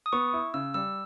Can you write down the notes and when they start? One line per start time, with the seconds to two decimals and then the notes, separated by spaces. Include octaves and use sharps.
0.06 D#6
0.13 B3 C#6
0.33 E4
0.54 C#3 E6
0.74 G3 E6